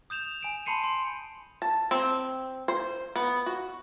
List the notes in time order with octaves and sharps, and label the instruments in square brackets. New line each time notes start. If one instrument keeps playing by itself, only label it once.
[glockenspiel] D#6 G6 E7 F7
G#5 D7 E7
A5 B5 C6 C7 C#7 D#7
C6
[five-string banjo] A5
C4
C5
B3
F#4